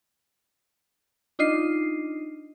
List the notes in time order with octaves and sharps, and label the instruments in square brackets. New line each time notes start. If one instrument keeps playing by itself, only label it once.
[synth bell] D4 D#4 F4 D#5 C7